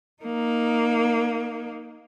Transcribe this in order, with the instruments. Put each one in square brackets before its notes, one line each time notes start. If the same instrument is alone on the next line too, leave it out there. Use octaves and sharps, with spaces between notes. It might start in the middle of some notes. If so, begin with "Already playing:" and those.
[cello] A#3 D#4